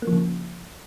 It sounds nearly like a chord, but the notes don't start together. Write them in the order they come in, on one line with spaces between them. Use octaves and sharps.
A#3 F3 C#3